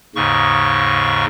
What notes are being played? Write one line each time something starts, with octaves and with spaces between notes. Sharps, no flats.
D#2 G#2 C#3 C#6